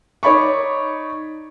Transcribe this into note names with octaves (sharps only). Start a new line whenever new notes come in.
D#4 C#5 D5 B5 C#6